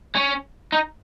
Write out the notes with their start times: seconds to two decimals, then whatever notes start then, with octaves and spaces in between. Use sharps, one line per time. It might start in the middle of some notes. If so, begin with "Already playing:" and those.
0.15 C#4
0.72 D#4